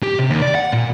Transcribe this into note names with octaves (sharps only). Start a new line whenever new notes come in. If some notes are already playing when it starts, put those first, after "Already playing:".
G4
C3
D#2
D5
F#5
A#2